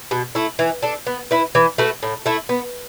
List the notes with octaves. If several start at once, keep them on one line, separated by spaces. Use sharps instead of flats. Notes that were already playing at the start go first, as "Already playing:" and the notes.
B2
A3 E4
E3
D4 A4
B3
E4 B4
E3
A3 F#4 B4
A2
A3 E4
B3